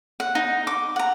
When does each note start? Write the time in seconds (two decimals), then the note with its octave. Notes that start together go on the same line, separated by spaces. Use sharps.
0.20 F#5
0.35 D#4
0.67 D6
0.96 F#5 A#5